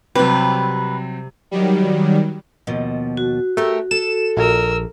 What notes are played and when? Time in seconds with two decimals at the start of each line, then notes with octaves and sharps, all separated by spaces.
0.15 C3 F#3 G3 C4 B4
1.51 D#3 F#3 G3
2.67 D#2 B2 F3
3.17 F#4
3.57 A3 G4 A#4
3.91 A4 E7
4.37 A#1 A#4 E6